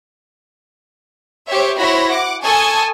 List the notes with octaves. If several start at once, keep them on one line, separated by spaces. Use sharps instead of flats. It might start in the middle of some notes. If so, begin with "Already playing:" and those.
G4 C5 C#5 E5
E4 F#4 C5 C#5 B5 A#6
F#5 D6
A4 G#5 A5 C#6 D#6 G#6